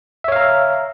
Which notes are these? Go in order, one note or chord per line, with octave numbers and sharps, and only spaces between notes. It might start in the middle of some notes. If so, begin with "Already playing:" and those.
C#5 E5 F5 A#5